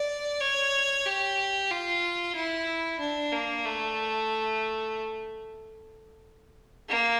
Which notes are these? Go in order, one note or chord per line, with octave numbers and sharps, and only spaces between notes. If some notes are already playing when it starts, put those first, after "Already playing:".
Already playing: D5
C#5
G4
F4
E4
D4
A#3
A3
A#3